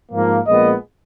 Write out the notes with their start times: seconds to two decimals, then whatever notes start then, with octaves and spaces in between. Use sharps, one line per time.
0.12 G#2 F3 A#3
0.46 A#1 A#2 G#3 B3 D#5